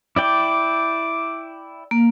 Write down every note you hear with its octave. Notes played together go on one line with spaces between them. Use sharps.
E4 D5 G5 D6
A#3